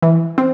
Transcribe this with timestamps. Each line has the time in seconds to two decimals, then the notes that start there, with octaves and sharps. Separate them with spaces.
0.02 E3
0.38 C4